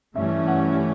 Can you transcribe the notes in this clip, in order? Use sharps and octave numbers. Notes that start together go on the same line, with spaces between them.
G2 E3 A3 C#4 E5
F#5